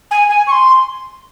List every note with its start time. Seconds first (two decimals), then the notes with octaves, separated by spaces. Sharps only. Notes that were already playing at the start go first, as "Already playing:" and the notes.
0.11 G#5
0.29 G#5
0.47 C#6
0.52 C6